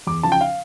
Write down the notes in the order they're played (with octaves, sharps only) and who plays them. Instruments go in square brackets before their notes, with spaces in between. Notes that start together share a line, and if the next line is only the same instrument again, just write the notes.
[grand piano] E2 D6
C#3 F3 A5
G5
F5